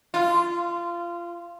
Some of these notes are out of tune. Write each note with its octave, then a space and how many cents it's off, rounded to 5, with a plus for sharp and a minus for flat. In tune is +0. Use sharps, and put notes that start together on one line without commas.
F4 -20